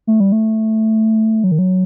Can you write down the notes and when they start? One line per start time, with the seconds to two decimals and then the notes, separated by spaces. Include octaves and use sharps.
0.07 A3
0.20 G3
0.32 A3
1.44 F#3
1.52 D#3
1.59 F#3